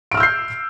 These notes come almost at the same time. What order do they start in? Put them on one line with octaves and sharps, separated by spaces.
D7 F6 E6 G6 C7